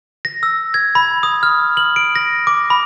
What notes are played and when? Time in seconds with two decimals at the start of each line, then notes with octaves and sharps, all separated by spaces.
0.25 A#6
0.43 E6
0.74 G#6
0.95 B5
1.23 D#6
1.43 F6
1.77 F#7
1.96 D7
2.16 A#6
2.47 D6
2.70 B5